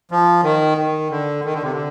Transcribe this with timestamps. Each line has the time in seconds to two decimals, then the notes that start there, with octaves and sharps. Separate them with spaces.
0.11 F3
0.44 D#3
0.78 D#3
1.11 D3
1.45 D#3
1.54 D3
1.63 C3
1.72 D3